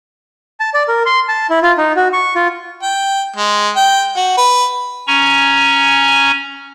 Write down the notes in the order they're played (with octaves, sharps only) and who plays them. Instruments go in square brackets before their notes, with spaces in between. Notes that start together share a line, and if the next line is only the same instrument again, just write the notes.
[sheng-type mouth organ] A5
D5
A#4
C6
A5
E4
F4
D#4
F#4
C#6
F4
[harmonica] G5
G#3
G5
F#4
B4
[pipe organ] C#4 G#5 A#5 C#6